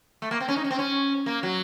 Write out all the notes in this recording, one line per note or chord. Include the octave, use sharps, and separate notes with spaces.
A3
A#3
C4
C#4
D#4
C#4
C4
C#4
A#3
F#3